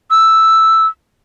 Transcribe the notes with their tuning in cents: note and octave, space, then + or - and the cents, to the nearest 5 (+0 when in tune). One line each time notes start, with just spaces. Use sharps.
E6 +0